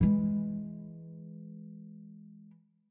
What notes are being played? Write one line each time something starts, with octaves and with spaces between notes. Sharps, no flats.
E3 G#3